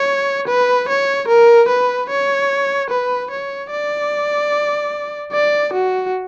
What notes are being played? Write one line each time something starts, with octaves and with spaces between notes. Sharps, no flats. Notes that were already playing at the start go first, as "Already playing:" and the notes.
Already playing: C#5
B4
C#5
A#4
B4
C#5
B4
C#5
D5
D5
F#4